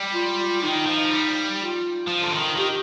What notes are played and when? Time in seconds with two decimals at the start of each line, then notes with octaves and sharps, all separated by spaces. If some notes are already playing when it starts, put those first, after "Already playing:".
Already playing: G3
0.14 F4
0.62 D#3 D#4
0.86 F3
1.11 G3
1.60 F4
2.08 F3
2.23 D3
2.33 D#3
2.57 D#3 G4